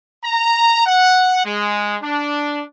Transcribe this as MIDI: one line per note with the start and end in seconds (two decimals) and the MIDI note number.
0.24 0.84 82
0.86 1.44 78
1.45 1.96 56
2.03 2.63 62